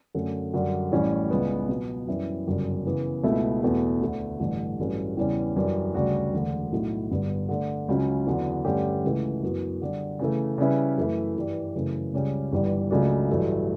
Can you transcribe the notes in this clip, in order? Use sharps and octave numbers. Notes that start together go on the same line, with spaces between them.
F#2 D3 A3 C#4
F#2 D3 G3
A1 A2 G3 C#4
C#2 C#3 G3 B3
B2 F#3 B3
F#2 E3 G3 C#4 E4
G1 F#2 C#3 G3
C#3 E3 B3
C#2 B2 A3 E4
E2 B2 A3
D2 D3 A3
A1 G2 D3
A1 G2 F#3 A3 C#4
E2 C#3 E3 G3 C#4
F#2 E3 G3 D4
D2 C#3 G3 D4 F#4
E1 D2 D3
B1 A2 F#3 A3 E4
G1 G2 D3 G3 B3
D3 A3 D4
C#2 C#3 F#3 C#4
E2 D3 F#3
G2 D3 A3 C#4 G4
C#2 C#3 E3 A3
F#2 E3 B3 F#4
D3 G3 D4
C#3 E3 A3
C#3 G3 C#4 E4 B4
F#2 E3 A3 E4
G2 E3 G3
F#2 C#3 E3 A3
C#2 C#3 G3 C#4 G4
G1 G2 E3 G3
C#2 C#3 F#3 A3 D4
A1 G2 F#3 A3 E4